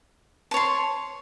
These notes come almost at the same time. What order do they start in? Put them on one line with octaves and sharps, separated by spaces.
A5 C#5 C6